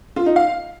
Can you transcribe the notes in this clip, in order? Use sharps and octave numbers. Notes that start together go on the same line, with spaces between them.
F4
D#4
F5